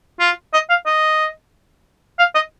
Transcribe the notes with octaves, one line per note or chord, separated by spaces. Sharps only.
F4
D#5
F5
D#5
F5
D#5